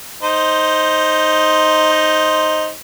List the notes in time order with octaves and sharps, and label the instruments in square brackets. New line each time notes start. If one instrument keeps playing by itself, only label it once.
[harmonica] D#4 C5